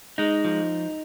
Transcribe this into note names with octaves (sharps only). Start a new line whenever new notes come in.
G#3 D#4
F3